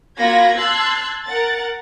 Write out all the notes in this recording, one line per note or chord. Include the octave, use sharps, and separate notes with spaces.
A#3 F4 F#4 B5 G#6 A#6
A5 C6 E6 F#6 G#6 A6
A#4 F#5 A6